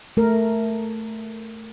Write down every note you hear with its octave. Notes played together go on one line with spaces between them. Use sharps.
A3 A#4